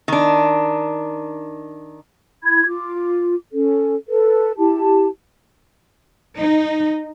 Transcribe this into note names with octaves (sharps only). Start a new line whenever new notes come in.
D#3 D4
E4 B5 G#6
F4 D6
C#4 A4
A4 B4
E4 G4 A5
D#4